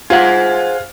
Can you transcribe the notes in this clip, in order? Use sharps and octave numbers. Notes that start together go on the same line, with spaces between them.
F4 G#4 C5 F#5